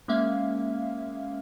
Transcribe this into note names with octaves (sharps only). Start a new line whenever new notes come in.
G#3 A#3 C#4 E5 F5